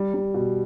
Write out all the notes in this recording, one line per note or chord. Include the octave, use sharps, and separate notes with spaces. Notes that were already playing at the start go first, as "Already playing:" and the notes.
Already playing: G3
G3
B2